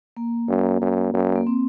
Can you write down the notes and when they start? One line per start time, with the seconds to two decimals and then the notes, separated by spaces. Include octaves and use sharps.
0.17 A#3
0.49 F#2
0.81 F#2
1.14 F#2
1.36 A#3
1.47 C4